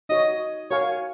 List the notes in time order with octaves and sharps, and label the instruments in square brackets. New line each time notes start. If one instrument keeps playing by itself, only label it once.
[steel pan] D#4 F#4 C#5 [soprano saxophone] D#5
[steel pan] F#4 A#4 F5 G#5 C#6 [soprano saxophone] C#5